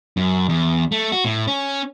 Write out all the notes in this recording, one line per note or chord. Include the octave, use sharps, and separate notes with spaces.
F#2
E2
A3
F#4
A2
C#4